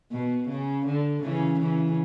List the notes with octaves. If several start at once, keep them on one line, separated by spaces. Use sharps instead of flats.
B2
C#3
D3
C#3 E3
C#3 E3